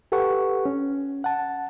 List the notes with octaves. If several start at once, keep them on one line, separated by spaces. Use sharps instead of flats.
G4 A4 B4 F#5 C#6
C#4
F#5 A5